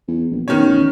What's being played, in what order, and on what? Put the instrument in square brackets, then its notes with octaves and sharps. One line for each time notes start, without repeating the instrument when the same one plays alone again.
[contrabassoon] E2
A#1
[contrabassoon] B2 [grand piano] D#3 C#4 C#5
[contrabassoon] A1